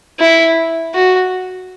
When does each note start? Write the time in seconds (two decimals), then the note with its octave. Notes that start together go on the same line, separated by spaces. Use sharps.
0.20 E4
0.94 F#4